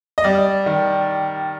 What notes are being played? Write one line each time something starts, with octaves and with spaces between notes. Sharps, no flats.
D#5
G3 D5
D#3